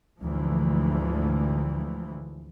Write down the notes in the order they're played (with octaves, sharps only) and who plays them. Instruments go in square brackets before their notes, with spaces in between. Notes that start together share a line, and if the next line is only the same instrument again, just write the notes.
[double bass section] D2 G#2 E3 F3